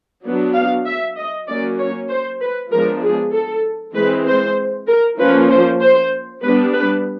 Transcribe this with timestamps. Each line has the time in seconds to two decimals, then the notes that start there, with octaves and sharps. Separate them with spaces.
0.24 F#3 B3 D4
0.55 F5
0.86 E5
1.17 D#5
1.48 F#3 A#3 C#4 D5
1.78 C#5
2.09 C5
2.41 B4
2.72 F3 G#3 B3 D4 A#4
3.02 G#4
3.33 A4
3.95 E3 G#3 C4 B4
4.27 C5
4.88 A#4
5.19 F3 A#3 C#4 B4
5.50 C5
5.81 C5
6.43 G3 B3 D4 B4
6.74 B4